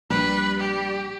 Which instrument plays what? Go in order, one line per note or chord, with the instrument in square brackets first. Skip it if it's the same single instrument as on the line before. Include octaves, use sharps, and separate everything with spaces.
[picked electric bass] A#1 [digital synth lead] G3 [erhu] B4
[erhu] G4